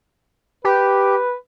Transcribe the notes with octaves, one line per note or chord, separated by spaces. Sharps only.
G4 B4